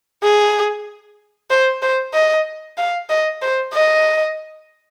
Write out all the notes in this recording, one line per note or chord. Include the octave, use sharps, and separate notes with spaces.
G#4
C5
C5
D#5
F5
D#5
C5
D#5